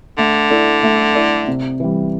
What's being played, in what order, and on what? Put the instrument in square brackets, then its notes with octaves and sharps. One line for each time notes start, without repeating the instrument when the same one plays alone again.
[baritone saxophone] D3 [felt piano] A3
[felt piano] E4 A4 D5
A3
E4 A4 D5
C3
E3 G3